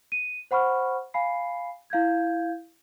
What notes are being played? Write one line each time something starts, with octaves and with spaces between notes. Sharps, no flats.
D#7
C5 F#5 B5 C#6 F6
F5 G#5 B5 C7
E4 F5 G6 G#6